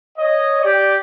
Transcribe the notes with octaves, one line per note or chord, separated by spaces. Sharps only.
C#5 D#5
G4 D5